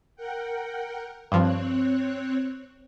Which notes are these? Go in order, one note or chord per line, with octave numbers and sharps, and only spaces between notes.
A#4 F#5 G5
G2 F3 C4 C#5 F#6